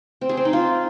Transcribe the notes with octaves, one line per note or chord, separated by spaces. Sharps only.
C4
G#4
C4
D#4
F4